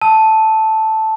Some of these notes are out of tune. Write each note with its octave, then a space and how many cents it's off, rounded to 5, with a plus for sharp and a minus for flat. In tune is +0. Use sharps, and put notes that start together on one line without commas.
A5 +0 E6 -35